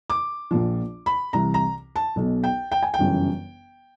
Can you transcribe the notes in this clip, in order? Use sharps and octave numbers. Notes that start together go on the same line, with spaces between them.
D6
A#1 A#2 F3
B5
C2 C3 E3 A#5
A#5
A5
B1 B2
G5
G5
G#5
G5
G1 F#2 C#3 E3